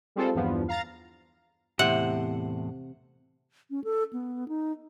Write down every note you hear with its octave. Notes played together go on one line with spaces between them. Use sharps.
G3 G#3 C4 F4 A4 C5
E2 G2 F3 B3
F5 A#5 A6
E2 A2 C3 C5 F#5
C#4
A4
B3
D#4